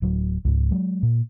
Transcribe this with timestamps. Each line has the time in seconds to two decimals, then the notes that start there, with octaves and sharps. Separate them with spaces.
0.02 D1 F#3
0.45 C#2 G#2
0.71 F#3 G#3
1.03 A#2